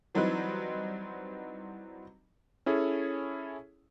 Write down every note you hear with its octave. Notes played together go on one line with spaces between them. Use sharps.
E3 F#3 G3 C4 D#4 B4
C#4 E4 G#4 A4 C#5